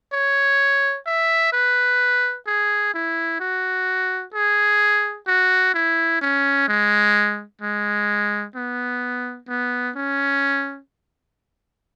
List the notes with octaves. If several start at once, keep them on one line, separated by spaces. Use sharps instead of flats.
C#5
E5
B4
G#4
E4
F#4
G#4
F#4
E4
C#4
G#3
G#3
B3
B3
C#4